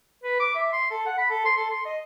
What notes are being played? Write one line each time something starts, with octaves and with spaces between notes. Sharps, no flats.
B4
D6
E5
C6
A4
F#5
B5
A4
C6
A4
C6
D#5